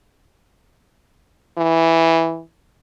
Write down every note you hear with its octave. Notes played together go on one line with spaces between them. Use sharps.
E3